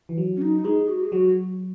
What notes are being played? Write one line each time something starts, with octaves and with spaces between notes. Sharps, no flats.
E3
F#3
C#4
D#4
G#3 G#4
F#4
G#4
F#3 F#4